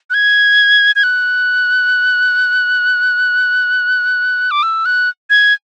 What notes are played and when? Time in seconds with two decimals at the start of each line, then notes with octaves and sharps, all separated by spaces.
0.10 F#6
0.14 G#6
0.96 G#6
1.03 F#6
4.51 D6
4.63 E6
4.86 F#6
5.30 G#6